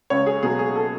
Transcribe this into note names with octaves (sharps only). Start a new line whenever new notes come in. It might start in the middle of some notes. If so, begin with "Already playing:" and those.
C#2 C#5
G#4
B2 F#3 G#4
G#4
A4